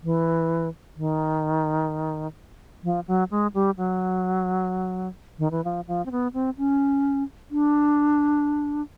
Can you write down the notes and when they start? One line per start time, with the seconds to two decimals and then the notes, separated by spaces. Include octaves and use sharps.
0.03 E3
0.96 D#3
2.84 F3
3.08 F#3
3.31 G#3
3.54 G3
3.77 F#3
5.39 D#3
5.51 E3
5.64 F3
5.87 F3
6.06 C4
6.12 B3
6.34 C4
6.58 C#4
7.51 D4